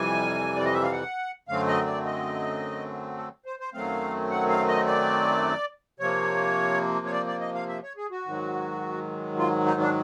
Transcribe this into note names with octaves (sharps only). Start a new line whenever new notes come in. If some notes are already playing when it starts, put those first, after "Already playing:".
Already playing: F2 C3 E3 G3 G#5
D5
D#5
E5
F5
F#5
F#2 D3 F#3 A3 C4 F5
D#5
D5
D#5
A4
C5
C5
F#2 D#3 F#3 A3 C4 F5
F#5
F5
D#5
D5
C3 F3 A#3 C#5
C#5
D5
D5
D#5
F5
E5
C#5
G#4
F#4
G#2 D#3 F#3
F4
D#4
D4